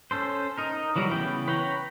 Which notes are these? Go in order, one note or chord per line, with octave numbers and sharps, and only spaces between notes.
C#4 A4 C5
D#4 A#4
E3 F#3 G3 F#4 A#4
C#3 E3 B3 G5 B5
B4 C#5 F#5 G5 A#5